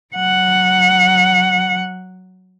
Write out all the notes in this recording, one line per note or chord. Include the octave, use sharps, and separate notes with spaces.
F#3 F#5